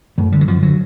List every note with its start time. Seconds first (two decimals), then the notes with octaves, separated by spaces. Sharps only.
0.18 F#2 A3
0.32 D3 G3
0.41 F#3
0.47 F#2 F3
0.63 D3 F#3